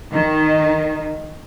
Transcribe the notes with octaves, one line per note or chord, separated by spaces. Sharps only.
D#3